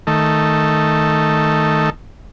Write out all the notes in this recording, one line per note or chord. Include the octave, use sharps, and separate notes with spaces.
D#3 A3